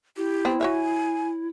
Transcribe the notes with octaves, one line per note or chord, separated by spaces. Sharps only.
E4 G4
B3 C4
F#4 C#5 E5 G#5